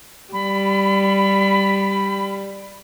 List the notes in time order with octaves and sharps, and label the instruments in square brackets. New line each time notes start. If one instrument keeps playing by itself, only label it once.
[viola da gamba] G3 [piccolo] B5